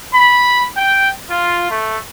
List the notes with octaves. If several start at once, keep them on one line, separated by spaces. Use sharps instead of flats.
B5
G5
F4
A3